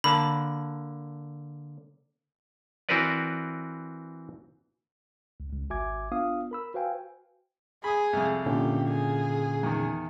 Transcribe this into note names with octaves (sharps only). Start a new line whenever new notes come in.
D3 A#3 A5 B5
E3 C4 F#4 A#4 B4 D5
C#2
C#2
G#1 F#4 E5 G#5 D6 G#6
B3 D4 F4 F5 D#6
A#4 B5 E6
F#4 B4 C5 F5 G5 G#5
G#4 B5 D#6
C2 F2
A#2 D3 C#4 G4
G#4
E2 D#3